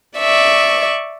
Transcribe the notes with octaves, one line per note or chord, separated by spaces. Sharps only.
D5 E5 C#6